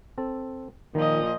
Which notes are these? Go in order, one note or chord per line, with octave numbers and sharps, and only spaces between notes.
C4 A4
A#2 D#3 F3 D#5